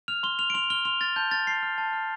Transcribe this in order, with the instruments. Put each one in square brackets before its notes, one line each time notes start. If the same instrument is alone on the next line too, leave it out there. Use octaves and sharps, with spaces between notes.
[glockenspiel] F6 F7
C6 G7
F6 F7
D7
C6 F7
F6 G7
C6 F7
F6 A6
A5 G6
F6 A6
A5 C7
F6
A5
F6